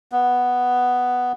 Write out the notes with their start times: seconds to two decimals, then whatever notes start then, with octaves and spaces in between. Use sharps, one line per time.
0.12 B3